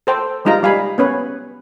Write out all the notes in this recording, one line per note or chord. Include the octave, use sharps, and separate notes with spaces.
A4 C5 G5
G3 G#3 D#4 F4 A#5
G3 F5 G#5 B5
B3 C#4 B4 C#5